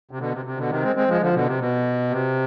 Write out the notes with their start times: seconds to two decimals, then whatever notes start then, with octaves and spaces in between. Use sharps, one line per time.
0.11 C3
0.19 B2 D3
0.32 C3
0.45 C3
0.57 B2 D3
0.70 C3 D#3
0.83 G#3 C4
0.95 G#3 C4
1.08 F3 G#3
1.21 D3 F3
1.33 B2 D3
1.46 C3
1.59 B2
2.10 C3